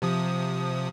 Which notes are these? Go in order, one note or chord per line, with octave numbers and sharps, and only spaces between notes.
C3 F3 D#6